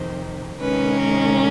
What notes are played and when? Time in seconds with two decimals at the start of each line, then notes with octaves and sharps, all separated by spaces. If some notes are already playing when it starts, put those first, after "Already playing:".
Already playing: F2 C3 D#3 C5
0.60 C3 D#3 G#3 C#4 B4
1.00 A#4